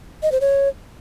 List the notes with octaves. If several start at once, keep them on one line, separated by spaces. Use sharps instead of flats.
D#5
C5
C#5